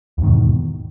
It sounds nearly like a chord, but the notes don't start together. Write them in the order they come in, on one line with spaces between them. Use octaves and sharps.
E2 G#2 D#3 B2